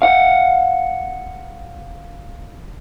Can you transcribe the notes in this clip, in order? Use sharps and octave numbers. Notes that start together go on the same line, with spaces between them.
F5 F#5